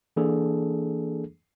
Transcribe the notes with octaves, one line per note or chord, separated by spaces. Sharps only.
E3 A#3 D4 G#4 A4